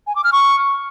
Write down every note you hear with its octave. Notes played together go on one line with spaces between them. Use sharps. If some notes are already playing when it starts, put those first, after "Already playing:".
G#5
D6
F6
C#6